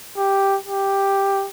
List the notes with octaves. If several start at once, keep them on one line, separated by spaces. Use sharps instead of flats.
G4
G4